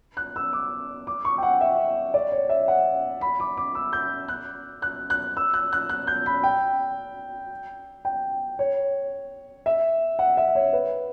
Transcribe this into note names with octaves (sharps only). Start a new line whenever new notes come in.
F#6
E6
D6
D6
C#6
G5
F#5
E5
D5
C#5
E5
F#5
B5
D6
D6
E6
G6
F#6
F#6
F#6
E6
F#6
F#6
F#6
G6
B5
G5
G5
C#5
E5
F#5
E5
C#5
B4